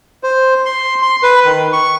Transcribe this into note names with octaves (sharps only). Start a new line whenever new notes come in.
C5
C6
C6
B4
D#3
C#6